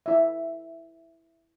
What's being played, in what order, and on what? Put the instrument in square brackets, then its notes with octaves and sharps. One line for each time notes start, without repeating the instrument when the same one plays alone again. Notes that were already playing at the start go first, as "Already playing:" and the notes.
[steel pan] E4 E5